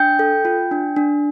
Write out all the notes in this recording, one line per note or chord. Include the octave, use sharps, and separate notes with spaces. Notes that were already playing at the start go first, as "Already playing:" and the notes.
Already playing: D4 G5 G6
A4
F4
D4
D4